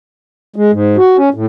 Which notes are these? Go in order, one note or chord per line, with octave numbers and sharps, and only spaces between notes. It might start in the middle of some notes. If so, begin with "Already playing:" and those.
G#3
G#2
F#4
C#4
A2